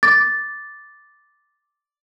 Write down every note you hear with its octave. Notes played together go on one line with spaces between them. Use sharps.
D6 A6